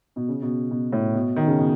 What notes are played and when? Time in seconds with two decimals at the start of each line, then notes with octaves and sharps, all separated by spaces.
0.16 B2
0.28 C#3
0.42 B2
0.71 B2
0.93 A2
1.14 B2
1.36 D#3
1.47 C#3
1.59 B2